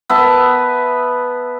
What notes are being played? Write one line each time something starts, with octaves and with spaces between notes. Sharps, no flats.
B3 E5 A5